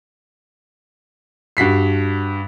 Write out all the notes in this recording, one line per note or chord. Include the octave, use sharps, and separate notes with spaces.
G2 F#4 B6 C7